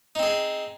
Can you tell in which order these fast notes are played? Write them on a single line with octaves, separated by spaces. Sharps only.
D#4 C4 G#4